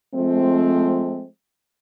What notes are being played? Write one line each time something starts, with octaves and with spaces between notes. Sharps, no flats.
F3 G#3 A3 C4